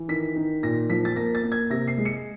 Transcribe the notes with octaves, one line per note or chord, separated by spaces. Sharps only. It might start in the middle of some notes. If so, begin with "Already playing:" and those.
Already playing: E3
D#3 B6
D#3
A#2 A#6
F3 B6
A6
A#3 A#6
A6
A#3
G#6
C3 A#6
C7
G#3
C#7